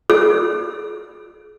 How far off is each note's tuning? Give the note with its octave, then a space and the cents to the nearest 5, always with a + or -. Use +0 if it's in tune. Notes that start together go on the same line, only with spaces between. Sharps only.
G#4 +30